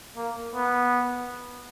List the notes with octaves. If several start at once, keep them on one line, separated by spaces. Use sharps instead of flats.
A#3
B3